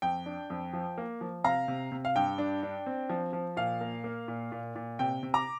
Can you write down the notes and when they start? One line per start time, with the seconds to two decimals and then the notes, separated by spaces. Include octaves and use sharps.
0.02 F2 G5
0.26 D4
0.50 F2
0.73 F3
0.98 A#3
1.21 F3
1.44 C3 F5 A#5
1.68 C3
1.92 C3
2.05 F5
2.16 G2 G5
2.38 D4
2.63 D4
2.86 C4
3.10 F3
3.33 F3
3.57 A#2 F5
3.81 A#3
4.04 A#3
4.28 A#2
4.52 A#2
4.75 A#2
4.99 C3 G5
5.23 C3
5.34 A#5 D6